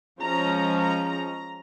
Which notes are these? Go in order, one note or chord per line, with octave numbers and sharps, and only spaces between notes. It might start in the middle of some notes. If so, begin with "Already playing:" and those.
F3 G#3 C#4 A#5
A#5
A#5